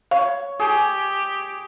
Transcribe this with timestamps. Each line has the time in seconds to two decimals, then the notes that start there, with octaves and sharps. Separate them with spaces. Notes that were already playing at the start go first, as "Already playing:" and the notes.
0.11 C#5 F5
0.60 G4 G#4